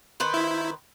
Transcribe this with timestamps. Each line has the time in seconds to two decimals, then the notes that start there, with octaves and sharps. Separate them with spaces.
0.20 D#3 B4 C5
0.34 E4